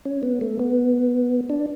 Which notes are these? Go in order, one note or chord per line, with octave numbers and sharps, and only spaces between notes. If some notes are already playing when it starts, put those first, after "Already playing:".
C#4
B3
A3
B3
D4